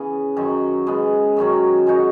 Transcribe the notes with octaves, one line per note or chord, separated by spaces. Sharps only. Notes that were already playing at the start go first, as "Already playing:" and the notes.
Already playing: C#3 E3 B3
F#2 D#3 F#3
C#3 G#3 B3
F#2 D#3 F#3 C#4
G#3 D#4 F#4 C#5